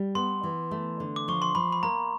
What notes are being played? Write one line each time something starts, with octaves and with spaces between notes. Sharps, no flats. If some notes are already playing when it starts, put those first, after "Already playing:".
Already playing: G3
B3 C6
E3
A3
D3
D6
F3 C#6
C6
F3 B5
B5
A#3 A#5